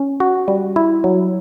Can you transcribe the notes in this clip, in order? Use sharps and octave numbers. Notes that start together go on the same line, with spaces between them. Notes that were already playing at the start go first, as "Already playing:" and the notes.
Already playing: C#4
F#4
G3
E4
F#3